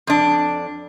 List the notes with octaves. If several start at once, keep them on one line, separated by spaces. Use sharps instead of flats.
F2 D4